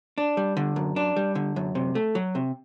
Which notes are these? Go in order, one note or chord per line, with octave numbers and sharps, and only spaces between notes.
D4
G3
D3
F#2
D4
G3
D3
F#2
C3
A3
F#3
C3